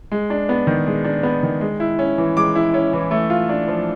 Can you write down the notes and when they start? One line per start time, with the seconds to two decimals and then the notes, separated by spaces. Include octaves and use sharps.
0.12 G#3
0.30 D4
0.49 B3
0.67 D#3
0.87 G#3
1.04 D4
1.23 B3
1.43 D#3
1.61 G#3
1.80 E4
1.99 C#4
2.18 E3
2.37 G#3 D6
2.55 E4
2.74 C#4
2.93 E3
3.11 A3
3.30 F4
3.49 D4
3.68 F3